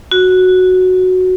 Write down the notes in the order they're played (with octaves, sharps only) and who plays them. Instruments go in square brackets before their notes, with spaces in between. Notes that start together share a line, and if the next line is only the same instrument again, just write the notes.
[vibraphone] F#4